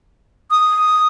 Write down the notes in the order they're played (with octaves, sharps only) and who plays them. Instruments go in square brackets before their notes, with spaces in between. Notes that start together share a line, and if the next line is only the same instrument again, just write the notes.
[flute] D#6